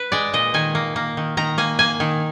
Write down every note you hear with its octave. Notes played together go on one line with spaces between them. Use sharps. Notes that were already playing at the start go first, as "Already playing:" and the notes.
Already playing: B4
G#3 D5
A#2 D#5
D#3 G#5
A#3
A#3
D#3
D#3 A#5
A#3 G#5
A#3 G#5
D#3